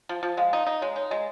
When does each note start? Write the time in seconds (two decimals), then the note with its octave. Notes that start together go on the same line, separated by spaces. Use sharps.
0.09 F3
0.23 F3
0.37 G#3 F5
0.53 D#4
0.67 D#4
0.82 G#3 C#5
0.96 D#4 C#5
1.11 G#3 D#5